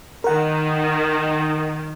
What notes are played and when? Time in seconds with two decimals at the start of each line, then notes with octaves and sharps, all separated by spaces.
0.24 D#3 A#4 F#5